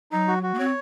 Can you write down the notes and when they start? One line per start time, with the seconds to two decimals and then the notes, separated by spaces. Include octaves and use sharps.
0.12 F#3 D#4
0.27 F#4
0.43 F#4
0.54 A#3
0.59 C4 C#5